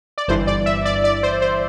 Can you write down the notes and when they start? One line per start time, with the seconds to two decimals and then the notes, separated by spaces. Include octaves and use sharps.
0.18 D5
0.28 G1 G2 E3 C5
0.47 D5
0.66 E5
0.85 D5
1.04 D5
1.23 C5
1.42 C5